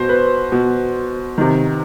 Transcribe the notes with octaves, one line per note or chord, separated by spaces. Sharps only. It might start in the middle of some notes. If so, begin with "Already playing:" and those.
Already playing: B2 C5
B4
B2
C3 D#3